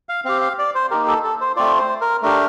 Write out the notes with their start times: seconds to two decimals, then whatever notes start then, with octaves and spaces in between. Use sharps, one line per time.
0.09 F5
0.25 C4 G4 F5
0.42 F5
0.59 D5
0.75 C5
0.91 A#3 D#4 G4 A#4
1.07 A4
1.24 A4
1.41 C5
1.56 A3 C4 F4 D5
1.79 C5
2.01 A#4
2.22 A3 D4 G4 A#4